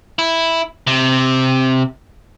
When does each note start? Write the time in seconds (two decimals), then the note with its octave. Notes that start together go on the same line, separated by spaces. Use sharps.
0.19 E4
0.87 C3